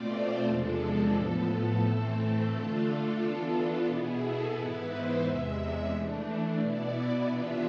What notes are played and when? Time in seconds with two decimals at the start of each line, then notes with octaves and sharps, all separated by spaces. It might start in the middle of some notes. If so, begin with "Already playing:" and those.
Already playing: B2 A3 C4 F4 D5
0.10 C5
0.44 E2 C3 F3 G#3 D4 A4
1.13 A2 F3 B3
1.81 A2 E3 A3 C4 A4
2.49 D3 A3 D4 F4 A4
2.84 A4
3.17 E3 B3 D4 F4
3.86 B2 B3 E4 G#4
4.20 A4
4.54 G#2 E3 B3 E4 B4
4.88 C5
5.22 E2 C3 G#3 E5
5.90 E3 A3 D4
6.59 B2 B3 E4 D5
7.27 C3 E3 B3 D4 F4 E5